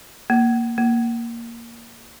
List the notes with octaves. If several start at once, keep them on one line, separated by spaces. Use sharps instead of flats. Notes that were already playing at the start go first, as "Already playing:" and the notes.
A#3
A#3